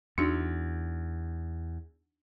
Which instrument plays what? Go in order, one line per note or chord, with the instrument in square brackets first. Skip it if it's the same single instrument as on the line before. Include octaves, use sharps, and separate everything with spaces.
[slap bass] E2 [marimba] D4 D#4 F#4